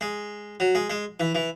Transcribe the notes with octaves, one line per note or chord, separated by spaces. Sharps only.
G#3
F#3
G#3
G#3
E3
E3